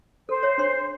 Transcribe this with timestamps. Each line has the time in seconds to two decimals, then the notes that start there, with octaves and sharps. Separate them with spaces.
0.29 A4 C5
0.43 C#5 E5
0.58 D4 C#5 C6